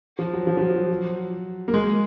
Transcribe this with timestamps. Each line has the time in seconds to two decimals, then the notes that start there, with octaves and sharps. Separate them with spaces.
0.19 F3
0.33 F#3
0.47 F3
0.57 F3
0.61 F#3
0.75 F#3
1.68 A#3
1.74 G#3